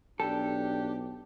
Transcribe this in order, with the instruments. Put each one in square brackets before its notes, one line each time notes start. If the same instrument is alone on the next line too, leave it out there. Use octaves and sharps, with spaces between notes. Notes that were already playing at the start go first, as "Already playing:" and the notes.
[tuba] B1 [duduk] D4 [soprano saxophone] G4 [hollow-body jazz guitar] A4